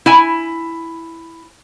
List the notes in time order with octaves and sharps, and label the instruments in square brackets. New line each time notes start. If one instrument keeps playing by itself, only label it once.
[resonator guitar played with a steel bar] E4 G#5